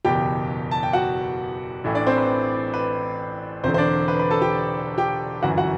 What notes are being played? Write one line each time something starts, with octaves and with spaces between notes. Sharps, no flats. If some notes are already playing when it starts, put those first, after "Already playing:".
F#1 E2 B2 G4 G5
A5
G5
F#4 F#5
A1 A2 E3
D4 D5
C4 C5
B4
B4
E1 E2 D3 C4 C5
C5
D4 D5
B4
B4
A4 A5
G4 G5
G4 G5
G1 F#2 E3 F#4 F#5
F#4 F#5